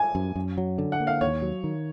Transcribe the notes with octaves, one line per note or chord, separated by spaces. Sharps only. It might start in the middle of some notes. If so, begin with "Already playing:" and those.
Already playing: G#5
F#2
F#2
F#3
D3
F#5
A#3
F5
D#2 C#5
F#3
D#3